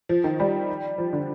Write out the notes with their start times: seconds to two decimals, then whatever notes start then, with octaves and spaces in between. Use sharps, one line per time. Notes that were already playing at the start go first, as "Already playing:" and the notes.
0.09 F3
0.24 D#3
0.40 G3
0.98 F3
1.13 D3